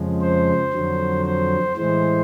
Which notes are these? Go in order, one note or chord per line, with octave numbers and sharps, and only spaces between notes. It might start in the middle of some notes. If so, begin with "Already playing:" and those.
Already playing: F2 C#3 F3 G#3
C5
F2 D3 F#3
C5
A2 E3 G#3 C5